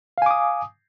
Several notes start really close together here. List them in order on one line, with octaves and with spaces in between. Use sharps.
F5 G#5 D6 D#6